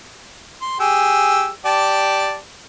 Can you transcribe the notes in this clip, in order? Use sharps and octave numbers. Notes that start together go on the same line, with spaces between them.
C6
G4 G#4 E6
G4 D5 A5